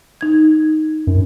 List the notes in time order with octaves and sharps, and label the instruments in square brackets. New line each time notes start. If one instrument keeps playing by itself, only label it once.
[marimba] D#4 G#6
[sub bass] F#2